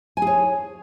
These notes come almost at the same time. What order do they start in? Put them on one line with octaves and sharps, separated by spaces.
G#5 G#4 C#5